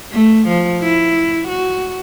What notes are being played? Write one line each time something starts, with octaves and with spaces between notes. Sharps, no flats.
A3
F3
E4
F#4